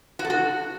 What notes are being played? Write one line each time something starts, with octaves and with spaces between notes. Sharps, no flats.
F#4
A4
F#4